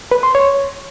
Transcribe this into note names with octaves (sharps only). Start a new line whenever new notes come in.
B4
C6
C#5